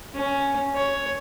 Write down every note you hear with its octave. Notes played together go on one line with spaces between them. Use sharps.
C#4
C#5